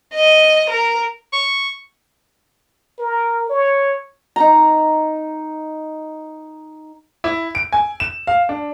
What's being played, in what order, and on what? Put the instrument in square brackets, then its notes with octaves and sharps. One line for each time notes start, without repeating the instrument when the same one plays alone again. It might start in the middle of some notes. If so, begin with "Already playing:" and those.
[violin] D#5
A#4
[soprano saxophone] C#6
[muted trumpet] A#4
C#5
[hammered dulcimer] D#4 A#5
[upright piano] E4
D7
G#5
E7
F5
D4